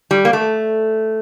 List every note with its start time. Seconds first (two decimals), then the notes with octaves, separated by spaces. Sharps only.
0.11 G3
0.25 A#3
0.33 A3